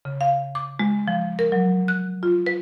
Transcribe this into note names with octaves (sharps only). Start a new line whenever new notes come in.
C#3
F5
D6
G#3
F3
A#4
F#3
F#6
F4
B4